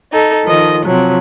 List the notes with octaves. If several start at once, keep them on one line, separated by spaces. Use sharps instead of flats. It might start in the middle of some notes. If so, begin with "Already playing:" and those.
D#4 A4
D#3 F3 D#5
C3 F3 F#3